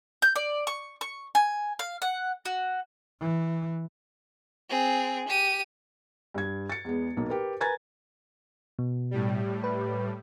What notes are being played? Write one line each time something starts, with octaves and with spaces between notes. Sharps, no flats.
G6
D5
C#6
C#6
G#5
F5
F#5
F#4
E3
C4 G#4
G4 D#7
G2 G#6
A6 C#7
E2 G#3 B3
B1 A#3
G4 A#4 B4
A#4 B4 G#5 A#5 G#6 A6
B2
A2 G3
B4